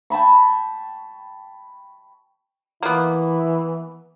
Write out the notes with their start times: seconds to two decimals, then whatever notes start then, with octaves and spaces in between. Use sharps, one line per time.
0.10 G5 A5 B5 C#6
2.83 E3 A#3 B3 E4